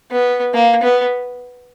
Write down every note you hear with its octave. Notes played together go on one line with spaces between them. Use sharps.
B3
A#3
B3